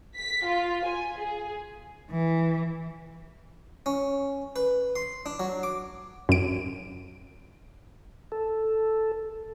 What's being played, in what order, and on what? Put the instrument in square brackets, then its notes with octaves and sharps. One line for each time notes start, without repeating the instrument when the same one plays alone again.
[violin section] B6
F4
G#5
G#4
[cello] E3
[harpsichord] C#4
B4
C6
D4
F#3
D6
[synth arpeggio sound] F#2 D7
[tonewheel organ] A4